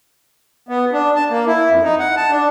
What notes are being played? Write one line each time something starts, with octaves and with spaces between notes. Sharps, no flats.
B3
D4
A5
A#3
E4
F2
D#4
F#5
A5
D4